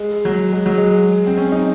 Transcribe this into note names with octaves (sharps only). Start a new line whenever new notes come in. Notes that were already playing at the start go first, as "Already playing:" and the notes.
Already playing: G#3
F#3
G#3
F#3
G#3
C4
C#4
D#4